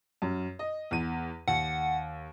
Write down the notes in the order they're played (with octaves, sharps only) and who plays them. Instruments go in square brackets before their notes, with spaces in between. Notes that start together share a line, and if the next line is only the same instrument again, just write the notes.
[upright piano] F#2
D#5
E2 D#7
[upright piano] D#2 [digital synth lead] F#5